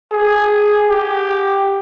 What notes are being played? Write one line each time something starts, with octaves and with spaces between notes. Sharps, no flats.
G#4
G4